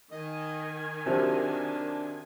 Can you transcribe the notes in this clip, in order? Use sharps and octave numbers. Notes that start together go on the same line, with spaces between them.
D#3 D#5 G#5
C3 F3 F#3 D4